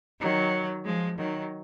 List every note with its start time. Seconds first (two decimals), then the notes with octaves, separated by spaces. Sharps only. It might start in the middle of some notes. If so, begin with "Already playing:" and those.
0.20 D#3 F#3
0.85 F3 G#3
1.18 D#3 F#3